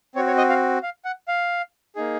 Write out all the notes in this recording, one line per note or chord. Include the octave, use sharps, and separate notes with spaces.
C4 F#4 C#5
C#5
D#5
F5
F5
F#5
F5
A#3 D#4 G#4